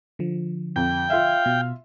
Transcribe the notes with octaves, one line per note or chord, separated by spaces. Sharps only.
D3 F3
F2 G5
F4 E5 F5
B2